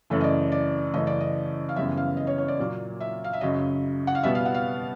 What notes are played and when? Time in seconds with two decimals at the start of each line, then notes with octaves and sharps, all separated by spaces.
0.10 F#2 C#3 E3 A3 A4
0.21 D#5
0.24 D5
0.52 D5
0.93 F#2 C#3 E3 A3 D#5
1.07 D5
1.21 D#5
1.69 F5
1.76 F#2 C#3 E3 G3 B3 E5
1.97 F5
2.17 D#5
2.27 C#5
2.38 C#5
2.48 D5
2.59 A#2 F#3 A#3
3.00 E5
3.24 F5
3.33 E5
3.41 F#2 C#3 F#3 D#5
4.07 F#5
4.15 F5
4.23 B2 G3 B3 E5
4.35 F5
4.45 F#5
4.54 F5